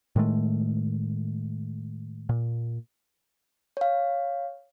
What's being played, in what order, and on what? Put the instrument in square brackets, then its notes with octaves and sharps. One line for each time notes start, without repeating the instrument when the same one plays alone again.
[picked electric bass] A2 D#3 G#3 A3
A#2
[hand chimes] C#5 F5